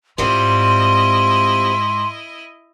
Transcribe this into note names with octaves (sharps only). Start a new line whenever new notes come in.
G#2 G3 C4 E4 F4 D#5 C6